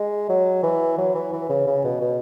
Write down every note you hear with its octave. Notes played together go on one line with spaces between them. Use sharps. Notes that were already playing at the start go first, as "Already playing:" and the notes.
Already playing: G#3
F#3
E3
F#3
E3
E3
C#3
C#3
B2
B2